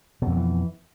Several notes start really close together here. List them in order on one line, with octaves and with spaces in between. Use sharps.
B2 F2 D3 E3